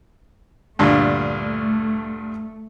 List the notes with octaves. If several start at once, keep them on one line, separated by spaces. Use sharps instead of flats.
D2 G2 A#2 A3